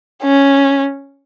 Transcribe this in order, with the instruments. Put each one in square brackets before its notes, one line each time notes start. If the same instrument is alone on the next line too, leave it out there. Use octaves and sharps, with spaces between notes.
[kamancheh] C#4